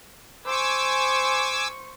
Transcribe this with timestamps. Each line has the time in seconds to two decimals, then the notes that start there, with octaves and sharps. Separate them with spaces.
0.45 C5 G#5 C#6 D6 E6